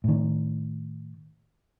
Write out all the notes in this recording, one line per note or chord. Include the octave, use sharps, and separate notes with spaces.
A2 D#3